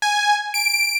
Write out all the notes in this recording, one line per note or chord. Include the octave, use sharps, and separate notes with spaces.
G#5
D7